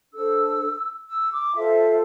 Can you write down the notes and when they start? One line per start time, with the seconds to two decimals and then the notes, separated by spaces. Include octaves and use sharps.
0.13 D4 A4 C5 E6
1.08 E6
1.31 D6
1.54 F4 A4 C5 E5